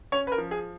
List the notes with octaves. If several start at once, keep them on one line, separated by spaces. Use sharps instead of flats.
C#4 C#5
B4
A#4
F3
G#4